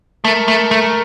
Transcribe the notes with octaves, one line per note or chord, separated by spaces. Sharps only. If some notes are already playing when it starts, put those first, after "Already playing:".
A3 A#4
A3
A3